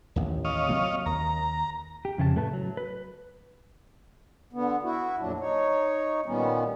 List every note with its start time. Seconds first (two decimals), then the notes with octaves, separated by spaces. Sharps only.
0.16 A1 D#2
0.45 C#5 D#5 F5
0.69 C3 F#3 A#3
1.06 D#2 A#5
2.05 G4
2.18 F2 C#3 F4 A5
2.35 A2 A3 B4 A5
2.53 F#3
2.77 B4
4.53 D3 B3
4.83 E4 F#4
5.19 F2 A#2 F#3 D4
5.40 D#4 C#5
6.26 A#2 D#3 G3 B3 C#4